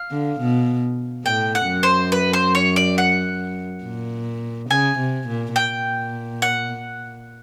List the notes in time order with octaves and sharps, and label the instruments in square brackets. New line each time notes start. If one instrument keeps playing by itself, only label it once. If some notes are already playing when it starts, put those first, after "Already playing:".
Already playing: [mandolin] F5
[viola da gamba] D3
B2
[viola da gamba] A2 [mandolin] G5
[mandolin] F#5
[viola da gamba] F#2
[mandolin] C5
B4
C5
C#5
D5
F#5
[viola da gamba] A#2
[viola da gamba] C#3 [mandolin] G#5
[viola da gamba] C3
A#2
[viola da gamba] A#2 [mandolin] G5
[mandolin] F#5